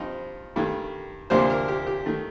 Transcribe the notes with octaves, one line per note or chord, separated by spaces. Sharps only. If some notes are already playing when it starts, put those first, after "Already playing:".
Already playing: G2 F3 C4 D#4
G2 D#3 A3
D2 C3 F3 A#3 D4 C5
A#4
G4
G4
D#3 A3